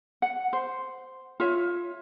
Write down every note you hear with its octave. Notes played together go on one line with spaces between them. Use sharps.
F#5
C5
F4 C#5 E5